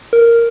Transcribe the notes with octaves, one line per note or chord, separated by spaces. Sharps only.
A#4